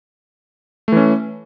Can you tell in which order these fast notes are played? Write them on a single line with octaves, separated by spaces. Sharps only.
A3 E3 C#4